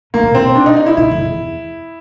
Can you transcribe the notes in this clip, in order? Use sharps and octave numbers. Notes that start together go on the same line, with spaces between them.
C#3 A#3
B2
A#2
C4
B2
D4
D#4
D#4
E4
B2 E4
F2
E2